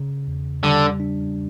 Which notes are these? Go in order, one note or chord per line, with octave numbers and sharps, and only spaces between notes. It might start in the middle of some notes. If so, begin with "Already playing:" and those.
Already playing: C#3
E2
D3 G3
D4